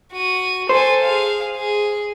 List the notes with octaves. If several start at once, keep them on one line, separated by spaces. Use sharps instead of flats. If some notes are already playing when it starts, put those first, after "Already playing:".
F#4 D#7
A4 C5 G#5
G#4 F5
G#4